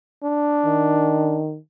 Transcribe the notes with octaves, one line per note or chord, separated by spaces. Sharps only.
D4
D#3